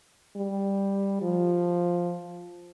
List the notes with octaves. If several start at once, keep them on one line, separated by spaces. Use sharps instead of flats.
G3
F3